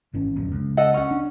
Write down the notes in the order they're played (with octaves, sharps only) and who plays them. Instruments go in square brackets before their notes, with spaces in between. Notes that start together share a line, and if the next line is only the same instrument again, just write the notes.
[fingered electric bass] G#1 E3 C#4
D1 A#1 F#2
C#2
[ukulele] A4 D#5 F#5
C#4 F#5
[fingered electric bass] D4